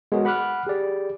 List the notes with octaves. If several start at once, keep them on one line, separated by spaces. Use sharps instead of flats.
G#3 B3 F#4 G#4 A#4 C#5
F#5 B5 D6 F6 F#6
G4 G#4 D5